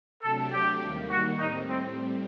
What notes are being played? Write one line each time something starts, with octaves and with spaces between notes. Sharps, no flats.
C3 F#3 A3 D4 G4 A4
G4
D#2 D#3 G3 A#3
F#4
A2 G3 C4 D#4
C4